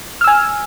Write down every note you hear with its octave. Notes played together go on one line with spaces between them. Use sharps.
G#5 E6 F6